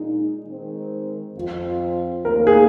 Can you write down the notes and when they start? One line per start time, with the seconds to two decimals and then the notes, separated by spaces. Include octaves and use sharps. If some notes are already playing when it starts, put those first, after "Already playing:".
Already playing: A#2 G#3 D#4
0.46 D#3 G#3 C4
1.35 F2 F3 C4 F4
2.25 D#2 D#3 A#3 D#4 A#4
2.47 G#4